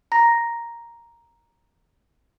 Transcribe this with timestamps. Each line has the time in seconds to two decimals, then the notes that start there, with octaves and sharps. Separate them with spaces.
0.12 A#5 A#6